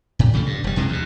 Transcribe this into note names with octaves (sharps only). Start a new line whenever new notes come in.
A2
C#3 F3 G#3 A3
G2
E1 G3
F1 C3 E3 G#3
D#2 B2